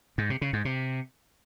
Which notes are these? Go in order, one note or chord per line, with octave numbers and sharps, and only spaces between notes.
G#2
C3
C#3
G#2
C3